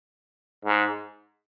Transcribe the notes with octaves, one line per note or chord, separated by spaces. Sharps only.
G#2